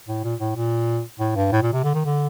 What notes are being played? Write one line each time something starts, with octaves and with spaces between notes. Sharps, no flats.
A2
A#2
A2
A#2
A2
G2
A2
A#2
C3
D3
D#3
D3